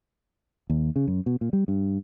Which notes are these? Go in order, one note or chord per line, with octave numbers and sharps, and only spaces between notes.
D#2
C#3
F#2
B2
A#2
G3
G2